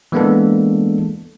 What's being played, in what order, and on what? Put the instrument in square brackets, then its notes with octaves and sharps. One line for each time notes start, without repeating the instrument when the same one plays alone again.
[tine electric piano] E3 G#3 A#3 B3 D4 A4